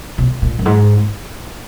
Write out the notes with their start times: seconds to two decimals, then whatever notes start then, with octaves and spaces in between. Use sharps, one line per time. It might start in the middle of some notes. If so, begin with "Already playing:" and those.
0.18 B2
0.42 A#2
0.59 F#2
0.66 G#2